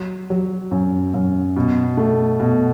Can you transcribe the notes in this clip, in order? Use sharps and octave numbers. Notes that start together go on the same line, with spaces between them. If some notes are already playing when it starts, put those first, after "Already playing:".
Already playing: F#3
F#3
F#2
F#2
B2
A3
B2